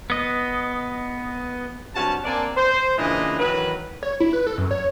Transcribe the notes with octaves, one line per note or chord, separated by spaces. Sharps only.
B3 D#5
G2 C3 C#4 F#4 A5
A#3 C4 D4 D5 G#5 A5
C5
A#2 C#3 E3 D4 B4 D#5
D#3 E3 F#3 B4
C#5
E4
B4
A4
F#2
C#5